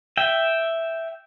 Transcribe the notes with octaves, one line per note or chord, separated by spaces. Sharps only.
E5 G5